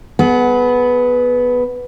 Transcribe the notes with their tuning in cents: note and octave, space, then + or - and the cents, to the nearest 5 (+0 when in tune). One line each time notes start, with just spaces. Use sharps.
B3 +0 G#4 +35